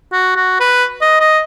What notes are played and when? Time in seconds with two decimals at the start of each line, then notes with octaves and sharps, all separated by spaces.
0.12 F#4
0.36 F#4
0.60 B4
1.01 D#5
1.20 D#5